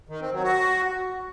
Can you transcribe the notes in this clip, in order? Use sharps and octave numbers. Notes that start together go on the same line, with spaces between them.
D#3
C4
F#3
F#4